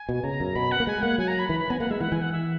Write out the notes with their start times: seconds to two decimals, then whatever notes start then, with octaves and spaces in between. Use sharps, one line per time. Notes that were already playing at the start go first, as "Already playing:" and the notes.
Already playing: G#5
0.09 B2
0.23 C#3 A#5
0.40 F#2
0.55 B2 B5
0.71 F#5
0.80 A#3
0.87 G#3 G#5
1.02 A#3 F#5
1.18 F#3 G#5
1.27 A#5
1.39 B5
1.49 E3 B5
1.59 B5
1.70 B3 G#5
1.80 A#3 F#5
1.90 G#3 E5
2.00 E3 F#5
2.12 E3 G#5
2.21 F#5
2.32 E5